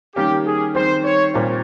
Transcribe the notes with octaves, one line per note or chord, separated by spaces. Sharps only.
D#3 G3 A#3 C#4 G4
G#4
D#3 G3 C4 C5
C#5
A#2 G3 C4 F4